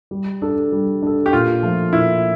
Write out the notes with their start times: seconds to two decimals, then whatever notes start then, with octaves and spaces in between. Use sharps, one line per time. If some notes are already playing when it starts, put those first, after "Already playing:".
0.11 G3
0.42 D4 A4
0.72 G3
1.02 D4 A4
1.26 G4
1.33 A#2 F4
1.63 F3 A3
1.93 A#2 E4